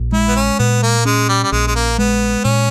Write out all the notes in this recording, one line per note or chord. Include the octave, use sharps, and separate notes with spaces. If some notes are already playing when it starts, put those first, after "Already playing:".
Already playing: A#1
G#3 E4
B3
C#4
A#2 B3
A#3
G#3 C#4
G3
G3
A#1 G#3
G#3
A#3
G#3 B3
A#2 C#4